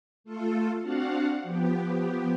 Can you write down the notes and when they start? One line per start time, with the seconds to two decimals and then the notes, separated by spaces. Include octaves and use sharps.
0.24 A3 F4 A4
0.82 C4 D4 F#4 F5 F#5
1.43 F3 B3 G4